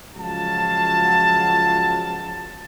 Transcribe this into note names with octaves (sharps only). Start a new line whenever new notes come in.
C#2 F3 F#3 F#4 F5 A5